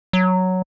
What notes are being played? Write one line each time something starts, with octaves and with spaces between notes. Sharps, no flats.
F#3